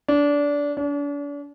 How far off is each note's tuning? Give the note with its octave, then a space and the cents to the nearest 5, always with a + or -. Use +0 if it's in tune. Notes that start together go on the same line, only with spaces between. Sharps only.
D4 -20
D4 -40